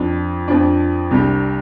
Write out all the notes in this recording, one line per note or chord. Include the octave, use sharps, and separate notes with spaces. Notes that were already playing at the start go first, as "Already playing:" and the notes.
Already playing: F2 F3 D4
F2 F3 D4
C2 C3 G3 D4 G4